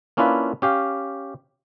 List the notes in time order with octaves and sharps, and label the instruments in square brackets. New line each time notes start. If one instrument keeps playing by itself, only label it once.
[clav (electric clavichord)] A#3 C#4 D4 E4 F4 B4
C#4 G4 F5